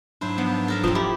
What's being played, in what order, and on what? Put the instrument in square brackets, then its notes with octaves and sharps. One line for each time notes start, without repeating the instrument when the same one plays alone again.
[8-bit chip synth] G#2 F#3 D4 [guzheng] E4 C5
[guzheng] F3 [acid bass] B3
[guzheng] A4 A#4 E5
[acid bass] E1 [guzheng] F3 C4 [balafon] F4
[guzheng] E4 [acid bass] G4